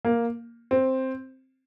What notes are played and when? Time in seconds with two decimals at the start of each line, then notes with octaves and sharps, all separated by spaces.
0.05 A#3
0.71 C4